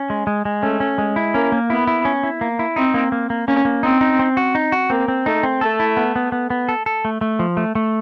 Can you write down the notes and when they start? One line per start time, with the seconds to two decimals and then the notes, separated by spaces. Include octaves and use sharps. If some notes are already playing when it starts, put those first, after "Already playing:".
Already playing: C#4
0.10 G#3
0.27 G#3
0.45 G#3
0.62 A3 C#4
0.80 C#4
0.98 G#3
1.16 E4
1.34 A#3 C#4
1.52 A#3
1.70 B3 E4
1.87 E4
2.05 C#4
2.23 E4
2.41 A#3
2.59 E4
2.76 C4 D#4
2.94 A#3
3.12 A#3
3.30 A#3
3.48 A#3 C#4
3.65 A#3
3.83 C4 D#4
4.01 D#4
4.19 C4
4.37 F#4
4.55 D#4
4.72 F#4
4.90 A#3 C4
5.08 C4
5.26 A3 D#4
5.43 C4
5.61 A3 A4
5.80 E4
5.97 B3
6.16 B3
6.32 B3
6.50 B3
6.69 A4
6.86 A4
7.05 A3
7.21 A3
7.39 F3
7.57 A3
7.75 A3